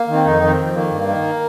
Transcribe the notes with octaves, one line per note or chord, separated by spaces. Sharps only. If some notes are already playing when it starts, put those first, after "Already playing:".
Already playing: A#3
D#3
C4
F2 D#4
D#3
C4
F2
D#3 A#3
G2
D#3